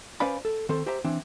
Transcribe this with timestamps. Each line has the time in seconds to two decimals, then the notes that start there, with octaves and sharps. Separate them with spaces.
0.20 C#4 B4 C5 D5 F5 B5
0.45 A4
0.69 D#3 C4 A4 C5
0.86 G4 C5 E5 A#5
1.05 E3 C4 D4